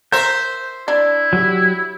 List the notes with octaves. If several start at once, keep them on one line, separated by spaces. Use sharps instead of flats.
A#4 C5 E5 G6
D4 E4
F#3 G4